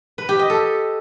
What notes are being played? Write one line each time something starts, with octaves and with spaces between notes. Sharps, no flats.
B4
G4
D#5
A4